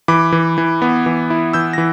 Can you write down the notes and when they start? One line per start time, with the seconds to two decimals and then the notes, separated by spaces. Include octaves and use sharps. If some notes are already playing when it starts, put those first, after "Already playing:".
0.08 E3 B5 D6
0.32 E3
0.58 E3
0.82 B3
1.06 E3
1.30 E4
1.53 E3 E6 G6
1.73 A#6
1.78 E3